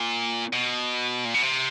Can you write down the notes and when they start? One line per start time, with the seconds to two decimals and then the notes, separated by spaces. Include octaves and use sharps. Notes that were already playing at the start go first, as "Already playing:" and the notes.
Already playing: A#2
0.53 B2
1.25 A#2
1.34 B2
1.43 C3